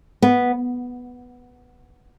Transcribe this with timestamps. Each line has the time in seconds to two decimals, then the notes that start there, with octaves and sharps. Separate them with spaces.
0.22 B3